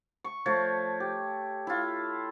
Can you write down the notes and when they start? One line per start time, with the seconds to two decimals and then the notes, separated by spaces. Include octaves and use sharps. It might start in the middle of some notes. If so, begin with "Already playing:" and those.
0.24 C#6
0.46 F3 A3 C#5
1.00 G4
1.67 E4 F4